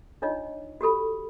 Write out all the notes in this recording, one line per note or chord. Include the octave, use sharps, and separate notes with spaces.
D4 D#4 F4 C#5 D#5
F#4 G4 A4 B5